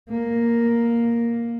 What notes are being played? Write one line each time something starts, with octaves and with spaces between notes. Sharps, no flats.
A#3